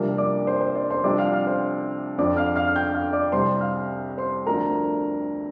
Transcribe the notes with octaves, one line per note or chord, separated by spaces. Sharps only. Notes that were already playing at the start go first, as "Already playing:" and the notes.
Already playing: C2 C3 F3 A#3 D4
D5 D6
C5 C6
C5
D5
C5 C6
C2 C3 F3 D4 D5 D6
F5 F6
F5 F6
C5 C6
F2 D3 F3 C4 D5 D6
F5 F6
F5 F6
F6
G5 G6
F5 F6
D5 D6
C2 C3 G3 C5 C6
F5 F6
C5 C6
D2 D3 F3 C4 A#4 A#5